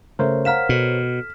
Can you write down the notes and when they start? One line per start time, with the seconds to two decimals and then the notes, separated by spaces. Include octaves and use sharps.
0.19 C#3 A3 A#4 C5 C#5 E5
0.45 F5 F#5 A#5 F6 B6 E7
0.69 B2 A4